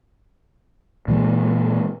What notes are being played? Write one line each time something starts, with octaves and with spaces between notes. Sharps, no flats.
A#2 E3 G#3